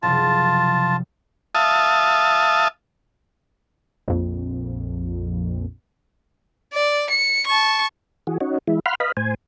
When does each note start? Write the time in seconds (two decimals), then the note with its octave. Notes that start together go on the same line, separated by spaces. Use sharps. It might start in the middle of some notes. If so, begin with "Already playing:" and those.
0.03 F#1 C3 F3 F4 A5
1.55 E5 F5 A5 D#6
4.08 A#1 F2
6.73 D5
7.10 C#7
7.47 A5 C#6
8.27 E3 F#4 G#4
8.40 C#4 D#4 F#4
8.67 E3 G#3 E4
8.86 F5 F#5 B5 C6 F6
9.00 B4 D#5 F5 B5
9.17 A2 C5 G#5